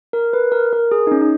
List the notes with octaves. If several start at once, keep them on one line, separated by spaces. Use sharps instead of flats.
A#4
B4
A#4
A#4
G#4
D#4
C#4
D#4